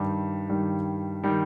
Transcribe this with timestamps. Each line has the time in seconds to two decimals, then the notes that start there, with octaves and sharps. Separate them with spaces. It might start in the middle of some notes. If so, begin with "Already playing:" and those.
Already playing: G2 D#3 G3
0.49 G2 D#3 G3
1.24 D#3 G3